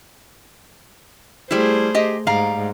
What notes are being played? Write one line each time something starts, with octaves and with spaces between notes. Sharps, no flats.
G3 A3 E4 G#4 C5
G4 D#5
G#2 G3 F5 A#5